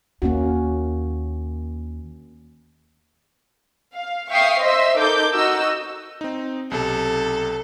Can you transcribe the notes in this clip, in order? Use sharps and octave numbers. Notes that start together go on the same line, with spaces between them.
D#2 A#3 C#4 F#4
F5
E5 F5 G5 C#6 D#6 C7
C5 D#5 E5 C6 E6
D#4 A4 A#4 D6 G6
D#4 F#4 D#5 E6
C4 D#4
B1 C3 A4